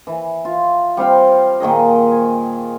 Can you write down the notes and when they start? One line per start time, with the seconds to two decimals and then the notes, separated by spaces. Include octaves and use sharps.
0.07 E3
0.45 F4
0.97 G3 C4 F5 G5
1.60 A#2 D#3 G#4 D#5
2.12 G#5